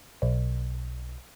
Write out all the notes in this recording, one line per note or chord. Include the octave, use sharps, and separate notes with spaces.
B1